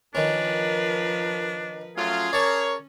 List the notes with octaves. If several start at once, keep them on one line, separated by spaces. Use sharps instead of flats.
D#3 F3 C#4 D4 A#4 B4
F#3 A3 C#4 F4 G#4
A#4 C#5 D5 A5